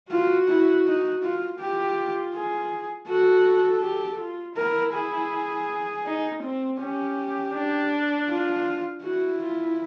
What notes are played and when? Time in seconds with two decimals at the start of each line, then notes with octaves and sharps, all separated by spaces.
0.11 F4 F#4
0.48 E4
0.86 D#4
1.23 F4
1.60 F4 G4
2.35 G#4
3.09 F#4 A4
3.83 G4
4.20 F4
4.57 E4 A#4
4.94 G#4
6.06 D#4
6.44 C4
6.81 C#4 G4
7.54 D4
8.30 F4
9.03 E4 F#4
9.41 F4